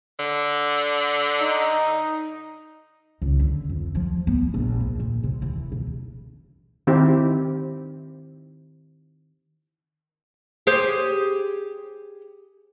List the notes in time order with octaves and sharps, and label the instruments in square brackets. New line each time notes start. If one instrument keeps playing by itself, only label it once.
[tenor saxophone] D3
[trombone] D#4
[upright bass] C#2
D3
F2
F3
B3
A#1
A#2
A#2
C3
E3
B2
[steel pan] D#3 C4 E4 G4
[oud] G4 G#4 C5